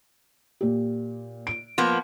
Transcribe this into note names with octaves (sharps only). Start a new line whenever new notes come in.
A#2 G4
D7
F3 A#3 B3